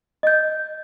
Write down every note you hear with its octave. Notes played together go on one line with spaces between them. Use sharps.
D#5 G6